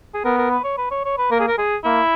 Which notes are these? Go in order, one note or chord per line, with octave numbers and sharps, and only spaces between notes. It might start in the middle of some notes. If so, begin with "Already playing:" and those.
G#4
B3 A#4
A#4
B4
C#5
B4
C#5
C#5
B4
A#3 A#4
G#4
A#4
G#4
A#3 E4